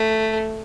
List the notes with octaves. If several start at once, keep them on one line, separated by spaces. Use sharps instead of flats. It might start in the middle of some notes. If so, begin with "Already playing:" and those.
Already playing: A3